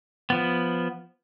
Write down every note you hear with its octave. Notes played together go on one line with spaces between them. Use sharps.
F3 B3